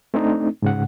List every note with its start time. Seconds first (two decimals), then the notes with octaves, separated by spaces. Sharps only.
0.14 A3 C4 D4 D#4
0.62 G#2 C#3 F#5